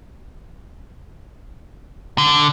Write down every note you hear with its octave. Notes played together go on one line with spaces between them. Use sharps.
D3